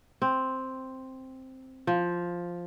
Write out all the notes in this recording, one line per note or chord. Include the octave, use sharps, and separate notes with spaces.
C4
F3